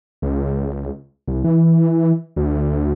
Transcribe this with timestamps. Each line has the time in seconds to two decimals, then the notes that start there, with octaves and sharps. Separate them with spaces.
0.22 C#2
1.28 C2
1.44 E3
2.36 D2